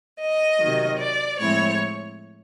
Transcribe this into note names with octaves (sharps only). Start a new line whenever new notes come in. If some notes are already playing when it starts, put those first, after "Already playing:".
D#5
C3 D#3 F#3
D5
A2 F3 G#3 C4 E4 C#5